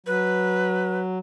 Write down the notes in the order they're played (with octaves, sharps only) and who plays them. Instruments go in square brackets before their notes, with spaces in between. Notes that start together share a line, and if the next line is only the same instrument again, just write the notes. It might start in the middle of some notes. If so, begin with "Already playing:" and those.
[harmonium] F#3 [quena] B4